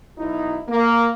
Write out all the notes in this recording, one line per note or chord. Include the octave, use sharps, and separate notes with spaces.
B1 D#4 E4
A#3